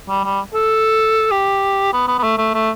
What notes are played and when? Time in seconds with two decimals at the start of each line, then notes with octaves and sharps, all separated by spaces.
0.09 G3
0.24 G3
0.54 A4
1.32 G4
1.93 B3
2.08 B3
2.18 B3
2.23 A3
2.38 A3
2.54 A3